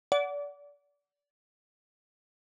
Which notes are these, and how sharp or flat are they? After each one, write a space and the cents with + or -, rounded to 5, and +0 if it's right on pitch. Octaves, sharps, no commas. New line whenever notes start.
D5 -30 F#5 +0